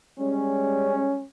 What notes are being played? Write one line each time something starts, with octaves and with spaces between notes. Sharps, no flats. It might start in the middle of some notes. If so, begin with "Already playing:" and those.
G3 G#3 C#4